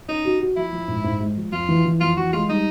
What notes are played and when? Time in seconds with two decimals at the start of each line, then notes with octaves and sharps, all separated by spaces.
0.08 C#4 D#4
0.25 F#4
0.40 F#4
0.56 F3 E4
0.72 F3
0.88 G#2
1.04 G#2
1.20 G#3
1.37 F3
1.52 F2 F4
1.69 E3
1.85 E3
2.00 F2 F4
2.17 E3 F#4
2.33 G#3 F4
2.49 G3 D#4